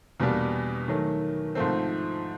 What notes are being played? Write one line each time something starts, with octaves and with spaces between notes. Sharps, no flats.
E2 B2 G3 A#3 D4
D#3 F#3 A3
G#2 F3 A3 C4